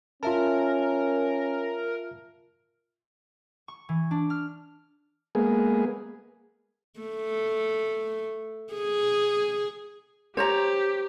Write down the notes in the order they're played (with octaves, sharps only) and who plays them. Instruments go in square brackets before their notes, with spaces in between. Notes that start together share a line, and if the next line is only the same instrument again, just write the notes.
[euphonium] C#4 [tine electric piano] F4 E5 A5 [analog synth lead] A#4
[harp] C#6
E3
D4
F6
[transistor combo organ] G#3 A#3 B3 G#4
[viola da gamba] A3
G#4
[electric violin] G4 [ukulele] C5 C#5 A#5